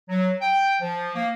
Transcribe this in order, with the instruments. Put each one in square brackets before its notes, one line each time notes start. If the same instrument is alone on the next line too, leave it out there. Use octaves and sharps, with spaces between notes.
[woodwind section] F#3
G5
F3
A#3